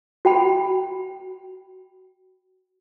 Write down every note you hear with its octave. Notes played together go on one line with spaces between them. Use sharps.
F#4 G5 B5